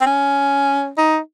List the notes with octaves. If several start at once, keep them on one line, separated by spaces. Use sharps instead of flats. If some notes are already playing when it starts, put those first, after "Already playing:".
C4
C#4
D#4